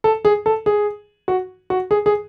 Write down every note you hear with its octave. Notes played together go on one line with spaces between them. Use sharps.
A4
G#4
A4
G#4
F#4
F#4
G#4
G#4